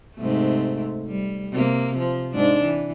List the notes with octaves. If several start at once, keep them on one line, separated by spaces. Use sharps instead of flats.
G#2 C3 A3
G3
C3 A#3
F3
G#2 D4
E3